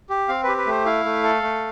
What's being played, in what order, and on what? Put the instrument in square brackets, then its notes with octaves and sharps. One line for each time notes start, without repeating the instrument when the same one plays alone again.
[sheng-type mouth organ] G4
C4 F5
G4 B4
B4
A3 C5
E4 F5
A3
A4
A3